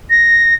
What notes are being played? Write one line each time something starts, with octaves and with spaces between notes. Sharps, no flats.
A#6